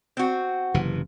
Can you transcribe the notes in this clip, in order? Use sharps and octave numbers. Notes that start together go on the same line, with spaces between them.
C4 F#4
F#1 C3 E3